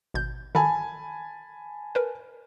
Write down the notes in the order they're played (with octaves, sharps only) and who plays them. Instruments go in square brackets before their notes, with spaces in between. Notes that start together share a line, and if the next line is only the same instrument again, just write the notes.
[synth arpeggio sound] G#1 B2 G6
[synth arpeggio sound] D#3 A4 [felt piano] G#5 A5 B5
[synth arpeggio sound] A#4 B4